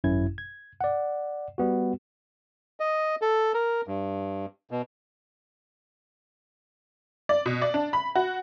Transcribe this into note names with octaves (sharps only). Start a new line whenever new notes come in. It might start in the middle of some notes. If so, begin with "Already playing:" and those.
G#1 F#2 C#4 E4 G#6
G#6
D5 F#5
G3 B3 F#4
D#5
A4
A#4
G2
B2
D5
B2
D5
D4
B5
F#4